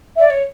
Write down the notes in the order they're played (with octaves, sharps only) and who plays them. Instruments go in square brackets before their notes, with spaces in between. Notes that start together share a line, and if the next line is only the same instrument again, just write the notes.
[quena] D5 [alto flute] E5
[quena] C#5